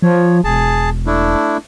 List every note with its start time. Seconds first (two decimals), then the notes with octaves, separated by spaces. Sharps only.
0.02 F3 C#5
0.44 E1 G#4 A5
1.06 A3 D4 E4